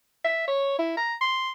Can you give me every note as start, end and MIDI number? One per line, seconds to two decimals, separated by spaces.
0.24 0.46 76
0.48 0.76 73
0.79 0.95 64
0.97 1.15 82
1.21 1.50 84